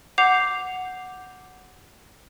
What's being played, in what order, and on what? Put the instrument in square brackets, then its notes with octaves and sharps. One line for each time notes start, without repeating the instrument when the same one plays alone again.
[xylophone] F#5 D6 G6 C7 F7